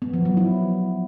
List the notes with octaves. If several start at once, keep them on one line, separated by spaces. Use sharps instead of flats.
B3
F3
F#3
E4